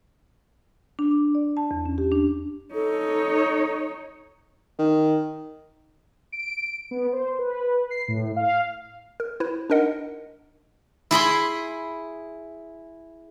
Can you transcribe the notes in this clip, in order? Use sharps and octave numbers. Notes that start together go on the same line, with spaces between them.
D4
D6
D5
A5
E2
C#4
G4
D4
D#4 A4 C#5
D#3
D7
B3
C5
B4
C7
A2
F5
A#4
E4 B4 C5
D4 D#4 A#4 D#5 F#5
E4 G#4 B5 C6